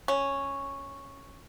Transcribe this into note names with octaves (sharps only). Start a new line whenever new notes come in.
C#4